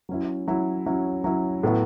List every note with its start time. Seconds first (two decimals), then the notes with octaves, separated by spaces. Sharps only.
0.09 F#3 C#4 E4
0.48 F#3 C#4 E4
0.86 F#3 C#4 E4
1.24 F#3 C#4 E4
1.63 A2 F#3 B3 E4